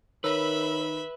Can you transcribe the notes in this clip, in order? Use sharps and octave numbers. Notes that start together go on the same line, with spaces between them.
D#3 A#4 B4 C#5 E5 B5 E6